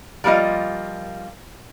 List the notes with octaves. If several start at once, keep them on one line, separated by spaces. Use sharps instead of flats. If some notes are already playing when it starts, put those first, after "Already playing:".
F3 G3 A#3 F4 D#5